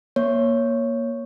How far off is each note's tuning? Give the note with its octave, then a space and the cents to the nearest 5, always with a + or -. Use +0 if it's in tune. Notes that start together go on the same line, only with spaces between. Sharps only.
A#3 +15 C#5 +0